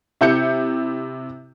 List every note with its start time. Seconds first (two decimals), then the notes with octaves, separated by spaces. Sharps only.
0.21 C3 E4 G6 C#7